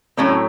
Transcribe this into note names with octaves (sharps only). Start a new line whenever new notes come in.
A2 F#3 A3 C4 C#4